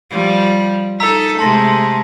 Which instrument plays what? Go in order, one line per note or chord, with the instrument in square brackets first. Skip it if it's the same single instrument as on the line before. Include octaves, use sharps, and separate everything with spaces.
[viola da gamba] F3 G3
[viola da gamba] D#4 A4 [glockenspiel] A#5 E6 B6
[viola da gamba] C3 G#3 A3 [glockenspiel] A5 C6 A#6